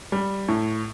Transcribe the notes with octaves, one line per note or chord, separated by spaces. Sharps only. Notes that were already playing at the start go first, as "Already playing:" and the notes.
G3
A2